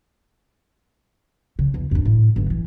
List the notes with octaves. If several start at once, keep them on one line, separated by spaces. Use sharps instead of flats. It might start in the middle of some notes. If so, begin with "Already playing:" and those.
C#3
E2
F2 D4
A2
G1 F#3
E3